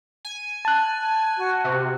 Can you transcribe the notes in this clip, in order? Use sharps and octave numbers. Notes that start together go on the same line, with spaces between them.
G#5
A5 F#6
F#4
C3